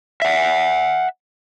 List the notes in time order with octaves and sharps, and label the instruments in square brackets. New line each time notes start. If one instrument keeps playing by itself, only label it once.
[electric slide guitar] E5 F#5